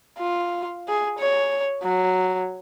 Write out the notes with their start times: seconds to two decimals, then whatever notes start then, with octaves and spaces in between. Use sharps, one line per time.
0.19 F4
0.88 G#4
1.19 C#5
1.82 F#3